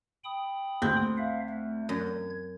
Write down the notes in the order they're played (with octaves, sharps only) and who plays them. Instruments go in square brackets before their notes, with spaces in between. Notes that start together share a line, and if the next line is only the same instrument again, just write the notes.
[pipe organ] G5 B5 D#6
[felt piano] D2 G6 [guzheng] C4
[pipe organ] E5 F5
A3
[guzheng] F#2 [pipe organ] G#6